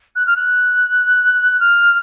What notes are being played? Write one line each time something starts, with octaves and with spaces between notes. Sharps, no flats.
F#6
F6
F#6
F6